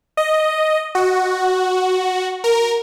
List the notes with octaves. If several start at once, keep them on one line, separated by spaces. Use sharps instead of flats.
D#5
F#4
A#4